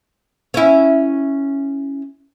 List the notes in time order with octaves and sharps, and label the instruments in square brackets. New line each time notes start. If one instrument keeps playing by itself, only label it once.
[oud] C#4 E4